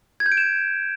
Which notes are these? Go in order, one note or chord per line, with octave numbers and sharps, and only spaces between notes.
G#6
G6
D7
E7